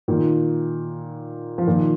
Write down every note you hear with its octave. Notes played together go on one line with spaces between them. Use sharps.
A#2 D#3
F3
A#2 D#3